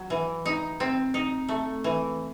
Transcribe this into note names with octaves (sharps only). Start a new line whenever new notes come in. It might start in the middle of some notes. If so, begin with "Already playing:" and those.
Already playing: F#3
E3
D#4
C4
D#4
A3
E3